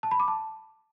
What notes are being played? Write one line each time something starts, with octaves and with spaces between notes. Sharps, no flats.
A5
B5
D6
A5